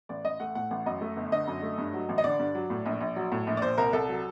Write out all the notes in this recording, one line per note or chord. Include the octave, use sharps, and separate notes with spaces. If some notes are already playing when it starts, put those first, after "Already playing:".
A1 D5
A1 D#5
A3 F#5
A2 F#5
A1 F#5
F#2 D#5
A3
G1
D3 D#5
F#2
A3
G2
F#3
A1
D#5
D3 D5
G2
F#3
A2
A#1
A#1
F#3
A2
A#1
D5
A#2 C5
C2 A#4
C2 A4
F#3